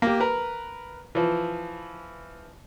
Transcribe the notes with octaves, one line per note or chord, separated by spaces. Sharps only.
A#3 G4
A#4 B4
E3 F3